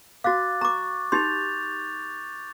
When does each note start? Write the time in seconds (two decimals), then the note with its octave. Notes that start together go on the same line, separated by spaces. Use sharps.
0.24 F#4 F5 D6 F#6 A6
0.61 A#5 C#6 D6
1.12 D#4 G4 C6 G6 A6 F7